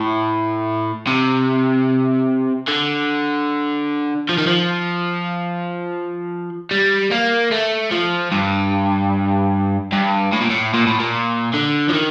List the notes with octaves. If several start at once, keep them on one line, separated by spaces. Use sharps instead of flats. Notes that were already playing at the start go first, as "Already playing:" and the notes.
Already playing: A2
C3
D3
F3
D#3
F3
G3
A#3
A3
F3
G2
G2
A2
A#2
A2
A#2
A2
A#2
D3
F3
D#3